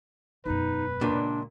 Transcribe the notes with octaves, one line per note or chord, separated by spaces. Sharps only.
E1 F#2 D#4 B4
C#2 A#2 D4